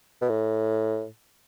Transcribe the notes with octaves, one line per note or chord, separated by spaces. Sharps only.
B2
A2